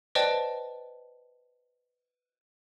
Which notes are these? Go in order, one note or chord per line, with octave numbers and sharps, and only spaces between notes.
B4 C5 D5 D#5 G5 A5